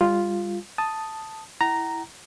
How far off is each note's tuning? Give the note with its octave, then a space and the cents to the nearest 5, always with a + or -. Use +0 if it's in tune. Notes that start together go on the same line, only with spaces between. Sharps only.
G3 +30 F4 +0
A5 +0 D#6 +0
E4 +0 F#5 +45 A#5 +0